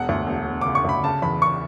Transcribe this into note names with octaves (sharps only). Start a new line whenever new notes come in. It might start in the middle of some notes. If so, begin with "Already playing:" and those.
Already playing: E1 F#5
D2
E1
E1
C#3 D6
C#6
D2 B5
C#3 A5
E2 B5
C#6